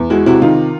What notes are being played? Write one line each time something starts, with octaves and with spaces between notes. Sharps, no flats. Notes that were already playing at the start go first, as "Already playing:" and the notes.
Already playing: E2
G#3 E4 F#4
C3 E4 F#4
D#3 D#4 F4